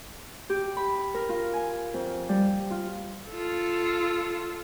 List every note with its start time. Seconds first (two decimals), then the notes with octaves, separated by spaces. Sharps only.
0.50 G4
0.77 B5
1.14 A#4
1.29 F4
1.53 G#5
1.94 F2
2.29 G3
2.71 F4
3.32 F4 A4